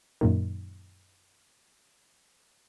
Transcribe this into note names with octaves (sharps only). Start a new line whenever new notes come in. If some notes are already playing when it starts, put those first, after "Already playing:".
F#2 A#2 D#3